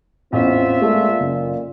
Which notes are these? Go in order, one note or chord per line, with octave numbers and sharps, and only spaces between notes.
A1 E2 C4 F4 E5
A#2 G#3 A3
F#1